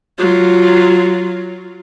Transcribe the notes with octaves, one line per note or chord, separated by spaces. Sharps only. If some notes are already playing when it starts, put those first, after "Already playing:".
F#3 F4